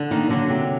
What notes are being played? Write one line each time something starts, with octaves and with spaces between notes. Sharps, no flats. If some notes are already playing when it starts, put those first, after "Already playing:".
Already playing: D3
D#3 A#3 D#4
D3 F#3 D4
C3